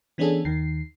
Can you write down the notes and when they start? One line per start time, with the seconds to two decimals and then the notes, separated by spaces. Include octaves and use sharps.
0.18 E3 B3 C#4 D4 G#4 A4
0.45 D#2 D#3 C7